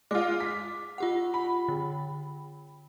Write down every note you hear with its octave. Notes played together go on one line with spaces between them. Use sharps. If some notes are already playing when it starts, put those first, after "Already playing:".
G#3 F4 D6
B6
F4 G4 F#5
B5
D3